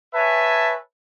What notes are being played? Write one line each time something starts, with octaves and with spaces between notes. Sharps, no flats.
B4 C#5 E5 G#5 A5